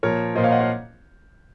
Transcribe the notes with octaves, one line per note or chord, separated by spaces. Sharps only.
A#2 F3 A#4 C#5
A#2 F3 C5 D#5
C#5 F5
D#5 F#5
C#5 F5